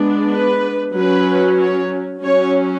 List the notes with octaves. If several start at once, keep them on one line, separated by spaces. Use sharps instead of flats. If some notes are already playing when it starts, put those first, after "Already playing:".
Already playing: G#3 B3 D4
B4
F#3 C#4 B4
C#5
F#3 C#4 C#5